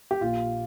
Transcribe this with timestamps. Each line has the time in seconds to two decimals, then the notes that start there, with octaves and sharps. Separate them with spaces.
0.11 G4
0.21 A#1 A#2 F4